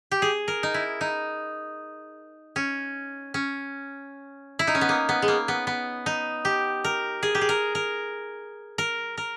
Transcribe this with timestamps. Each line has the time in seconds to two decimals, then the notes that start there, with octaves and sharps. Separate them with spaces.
0.11 G4
0.22 G#4
0.48 A#4
0.63 D#4
0.74 E4
1.01 D#4
2.56 C#4
3.34 C#4
4.59 E4
4.67 D#4
4.75 C#4
4.81 B3
4.89 A#3
5.09 B3
5.22 G#3
5.28 A#3
5.48 B3
5.67 B3
6.06 D#4
6.45 G4
6.84 A#4
7.23 G#4
7.35 G4
7.41 G#4
7.49 A#4
7.75 A#4
8.78 A#4
9.17 A#4